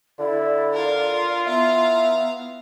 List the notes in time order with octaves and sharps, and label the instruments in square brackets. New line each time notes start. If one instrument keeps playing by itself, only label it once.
[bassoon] D3 [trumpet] E4 [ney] D5
[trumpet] F4 [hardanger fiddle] A#4 F5
[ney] B3 [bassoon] E4 [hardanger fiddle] F5 A#5